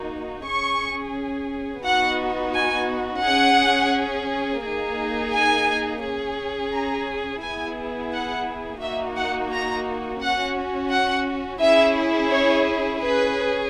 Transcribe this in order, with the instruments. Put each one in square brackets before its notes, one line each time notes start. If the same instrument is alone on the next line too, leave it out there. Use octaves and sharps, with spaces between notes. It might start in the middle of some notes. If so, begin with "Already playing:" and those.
Already playing: [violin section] A#3 D#4 F#4
C#4 G#4 C#6
B3 D#4 F#4 F#5
G#5
C#4 G#4 F#5
A#3 D#4 G#4
G#5
C#4 G#4
A#5
B3 E4 G#4 G#5
F#5
A#3 D#4 F#4 E5
F#5
A#5
C#4 F#4 F#5
F#5
C#4 E4 G#4 E5
C#5
C#4 G#4 B4